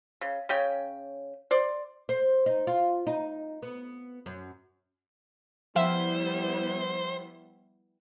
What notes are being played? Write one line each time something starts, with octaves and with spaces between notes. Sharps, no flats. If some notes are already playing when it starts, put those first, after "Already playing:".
C#3
C#3 C#4 G5
C5 D5
C5
D#4
F4
D#4
B3
F#2
F3 G3 B3 E4 C5 E5 F#5 G5